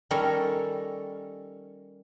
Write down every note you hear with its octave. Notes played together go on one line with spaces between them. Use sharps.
D#3 G3 C#4 A4 A#4 C#5